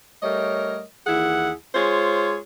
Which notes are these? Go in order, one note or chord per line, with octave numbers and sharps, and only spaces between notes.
G3 A3 A#4 C#5 D#5
D#2 E3 E4 G#4 F#5
G#3 F4 G#4 C5 C#5